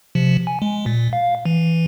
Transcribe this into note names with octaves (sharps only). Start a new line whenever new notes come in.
C3 F3
G#5
G#3
A#2
F5
E3